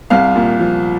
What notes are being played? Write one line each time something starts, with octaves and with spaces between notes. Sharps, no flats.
C2 F5
A#2
F3